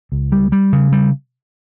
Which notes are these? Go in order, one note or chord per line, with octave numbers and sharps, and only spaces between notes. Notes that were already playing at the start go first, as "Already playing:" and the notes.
C#2
G3
G3
C#3
G3